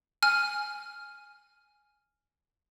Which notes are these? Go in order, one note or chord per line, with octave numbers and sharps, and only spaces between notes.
G#5 F6